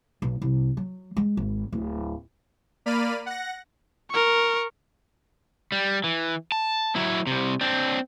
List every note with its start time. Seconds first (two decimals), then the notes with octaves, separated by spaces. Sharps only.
0.22 B1
0.42 C2
0.77 F#3
1.17 G#3
1.37 G#1
1.72 D1
2.86 A#3 D5 B5 F6 D#7
3.26 F#5 A#6
4.10 A#4 C#6
5.72 G3
6.04 E3
6.52 A5
6.95 F#3 E4
7.27 C2 C3
7.61 C4 D4